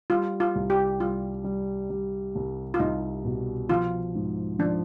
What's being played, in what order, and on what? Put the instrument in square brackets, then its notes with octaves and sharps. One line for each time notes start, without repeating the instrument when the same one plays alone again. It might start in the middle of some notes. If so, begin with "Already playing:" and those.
[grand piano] G3 [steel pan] F4
[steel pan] F4
[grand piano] C2
[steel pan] G4
[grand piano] G3 [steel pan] F4
[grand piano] G3
G3
C2
[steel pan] F4
[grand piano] C2 [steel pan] D#4
[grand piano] B2
[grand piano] F3 [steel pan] F4
[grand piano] G#2
[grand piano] F3 [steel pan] D4